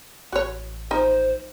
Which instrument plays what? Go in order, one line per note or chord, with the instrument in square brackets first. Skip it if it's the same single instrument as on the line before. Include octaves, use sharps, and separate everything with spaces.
[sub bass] A1 [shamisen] F#4 C#5
[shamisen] F3 D#4 [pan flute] C5